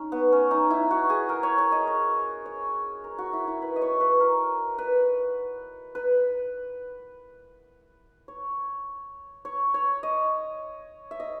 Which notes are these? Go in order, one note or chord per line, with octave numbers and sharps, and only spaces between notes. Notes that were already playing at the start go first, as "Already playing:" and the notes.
Already playing: C#4 D#4
B3
C#4
D#4
E4
F#4
G#4
A#4
C#5
C#5
D#5
D#5
C#5
A#4
F#4
E4
E4
B4
D#5
C#5
B4
A#4
B4
B4
C#5
C#5
C#5
D#5
E5
D#5